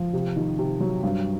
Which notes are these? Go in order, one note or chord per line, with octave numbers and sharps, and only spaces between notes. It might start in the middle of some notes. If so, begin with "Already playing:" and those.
Already playing: F3
C3
D#3
C3
F#3
G2